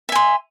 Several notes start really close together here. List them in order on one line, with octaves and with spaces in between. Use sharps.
E5 G#5 C6